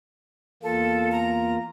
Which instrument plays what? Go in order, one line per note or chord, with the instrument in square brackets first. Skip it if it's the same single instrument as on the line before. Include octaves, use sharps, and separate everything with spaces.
[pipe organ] E2 A#3 F4 [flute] A4
[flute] A#5